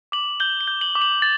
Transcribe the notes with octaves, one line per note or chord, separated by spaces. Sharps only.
D6 F#7
G6 G7
G7
G6
F#7
D6
F#7
A6